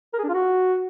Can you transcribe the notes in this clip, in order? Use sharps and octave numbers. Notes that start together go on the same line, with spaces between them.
A#4
G#4
D4
F4
F#4